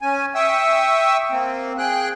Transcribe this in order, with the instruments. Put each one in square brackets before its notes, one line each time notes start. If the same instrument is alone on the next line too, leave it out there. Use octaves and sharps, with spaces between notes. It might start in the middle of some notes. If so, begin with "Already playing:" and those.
[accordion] C#4 G#5
E5 G5 C#6 D#6 E6
A#3 C4
G#4 G5 F#6